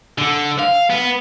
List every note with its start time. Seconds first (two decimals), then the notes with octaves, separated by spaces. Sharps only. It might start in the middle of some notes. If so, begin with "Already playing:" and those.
0.18 D3
0.59 F5
0.90 B3